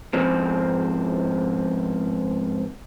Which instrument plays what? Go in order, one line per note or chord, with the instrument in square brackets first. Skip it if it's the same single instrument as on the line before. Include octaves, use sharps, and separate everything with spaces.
[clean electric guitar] F2 G#2 F3 C4